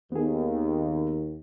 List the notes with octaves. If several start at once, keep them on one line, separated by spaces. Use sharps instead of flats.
D#2 B3 G#4